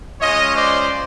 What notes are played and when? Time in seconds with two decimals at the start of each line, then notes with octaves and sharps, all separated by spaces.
0.20 G#3 C#4 F4 C#5 D#5
0.55 C5 D5